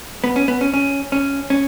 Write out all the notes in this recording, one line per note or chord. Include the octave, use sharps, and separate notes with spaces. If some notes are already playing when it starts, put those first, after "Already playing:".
B3
C#4
B3
C#4
C#4
C#4
C#4